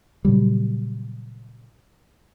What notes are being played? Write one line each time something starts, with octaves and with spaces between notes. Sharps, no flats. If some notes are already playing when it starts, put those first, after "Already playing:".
A#2 C#3 F#3 G3